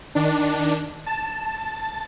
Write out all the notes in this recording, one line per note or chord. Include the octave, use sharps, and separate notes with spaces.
D#3 D4
A5